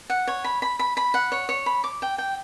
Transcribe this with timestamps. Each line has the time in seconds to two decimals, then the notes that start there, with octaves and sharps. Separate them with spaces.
0.10 F#5
0.27 C#5
0.44 B5
0.62 B5
0.79 B5
0.97 B5
1.14 F#5
1.32 C#5
1.49 C#5
1.66 B5
1.84 D6
2.02 G5
2.18 G5